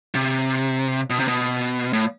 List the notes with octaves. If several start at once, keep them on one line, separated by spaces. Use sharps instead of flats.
C3
B2
C3
B2
A2